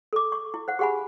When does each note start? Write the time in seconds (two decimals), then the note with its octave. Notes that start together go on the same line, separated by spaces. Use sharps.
0.13 A4 D6
0.32 C#6
0.54 E4
0.68 C5 F#5
0.79 G4 G#4 F#5 G#5 B5